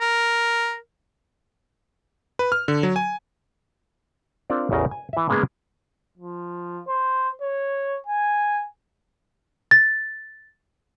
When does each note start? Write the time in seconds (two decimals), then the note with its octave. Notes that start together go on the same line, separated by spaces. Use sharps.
0.01 A#4
2.39 B4
2.52 F6
2.68 D3
2.83 F#3
2.96 G#5
4.50 C4 D4 F4 A#4 D5
4.71 A1 E2 C#3 A#4
4.91 G#5
5.13 E3 E5
5.29 C#3 G#3 A#3 B3 G#4 A#4
6.18 F3
6.88 C5
7.42 C#5
8.07 G#5
9.71 A6